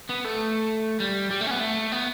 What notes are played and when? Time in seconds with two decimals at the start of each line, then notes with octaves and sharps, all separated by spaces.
0.09 B3
0.24 A3
1.00 G3
1.30 G3
1.41 A3
1.47 C#4
1.51 B3
1.60 A3
1.92 B3